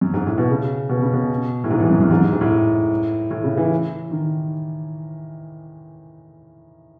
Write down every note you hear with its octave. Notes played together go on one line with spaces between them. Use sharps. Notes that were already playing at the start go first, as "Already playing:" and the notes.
F#2
G#2
A2
B2
C#3
B2
C#3
B2
A2
G#2
E2
F#2
F#2
G#2
F#2
G#2
A2
A2
C#3
E3
D#3